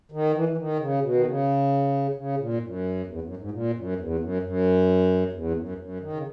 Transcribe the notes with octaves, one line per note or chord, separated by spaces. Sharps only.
D#3
E3
E3
D#3
C#3
B2
D#3
C#3
C#3
A#2
G#2
F#2
E2
F#2
G#2
A#2
F#2
E2
F#2
F#2
E2
G#2
F#2
E2
F#2
D#3
C#3